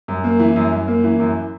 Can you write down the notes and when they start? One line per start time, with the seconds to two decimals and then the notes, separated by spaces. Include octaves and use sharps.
0.08 F#2
0.24 A#3
0.40 E3
0.56 F#2
0.72 F#2
0.88 A#3
1.04 E3
1.20 F#2